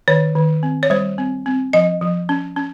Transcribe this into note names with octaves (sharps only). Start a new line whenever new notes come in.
D#3 C#5
D#3
C4
C#5
G3 C5
C4
C4
F3 D#5
F3
C#4
C#4